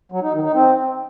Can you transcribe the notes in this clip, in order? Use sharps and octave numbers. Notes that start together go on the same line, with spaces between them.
F#3
D#4
D#3
D#4
C4